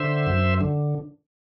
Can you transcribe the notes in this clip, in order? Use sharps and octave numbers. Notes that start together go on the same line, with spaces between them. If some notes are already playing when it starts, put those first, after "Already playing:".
Already playing: D3 C5 E5
F#2
D3